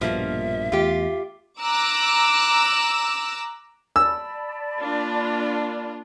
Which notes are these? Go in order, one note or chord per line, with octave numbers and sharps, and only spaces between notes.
A#1 G2 B2 F3 A#3 E5
E2 A3 F4 G4
A#5 D6 E6 F#6
D5 A5 B5 E6
A#3 D4 F4